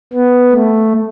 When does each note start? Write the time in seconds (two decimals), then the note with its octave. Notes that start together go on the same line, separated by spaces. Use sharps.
0.13 B3
0.53 A3